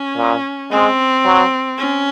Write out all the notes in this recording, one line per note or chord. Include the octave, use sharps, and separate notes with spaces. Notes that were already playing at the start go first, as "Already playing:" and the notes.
Already playing: C#4
A#2
G#3 C4
F#3
C#4